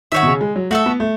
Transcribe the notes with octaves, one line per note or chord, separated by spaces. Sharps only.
D#3 F#4 C#5 E5
B2
C#3
G#3
F#3
A3 F#4 A4 E5
B3
A3